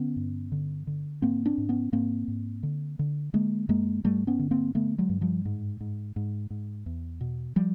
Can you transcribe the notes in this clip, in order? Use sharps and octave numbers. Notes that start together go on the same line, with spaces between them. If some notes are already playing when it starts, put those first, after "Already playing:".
Already playing: D3 B3 C#4
G2
D3
D3
G#2 A#3 C4
C4 D4
G#2
B3 C#4
G#2 A#3 C4
G#2
D3
D3
D3 G#3 A#3
F#2 G#3 A#3
G2 G3 A3
B3 C#4
D3
A#3 C4
D3 A3 B3
F#3 G#3
G2
F3 G3
G#2
G#2
G#2
G#2
E2
B2
F3 G3